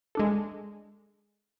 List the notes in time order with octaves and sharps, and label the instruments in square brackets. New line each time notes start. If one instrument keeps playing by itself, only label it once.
[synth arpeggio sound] G#3 D4 A4